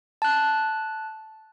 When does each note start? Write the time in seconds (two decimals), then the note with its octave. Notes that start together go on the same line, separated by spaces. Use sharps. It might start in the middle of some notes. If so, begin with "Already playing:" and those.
0.22 A5 F#6